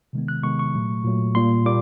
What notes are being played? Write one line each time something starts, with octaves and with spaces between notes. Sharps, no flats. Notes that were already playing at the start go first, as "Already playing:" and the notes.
C3 D#3 G#3 B3
F#6
C3 D#3 G#3 B3 C#6
C#6
A#2 F#3 A3
A#2 F#3 A3
A#2 G3 A#3 C6
A#2 G3 A#3 D6